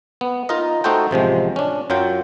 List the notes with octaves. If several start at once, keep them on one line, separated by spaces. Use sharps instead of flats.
B3
D#4 F4 A#4 D#5
A3 D#4 F#4 A4 C5 G5
A1 C3 F3 G#3
C#4 D4
F#2 F#3 F4 G5